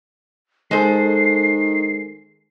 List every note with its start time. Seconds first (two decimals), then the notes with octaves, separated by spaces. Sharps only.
0.71 D#3 G#3 A4 C5 C7